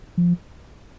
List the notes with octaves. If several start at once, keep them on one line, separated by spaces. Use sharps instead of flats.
F3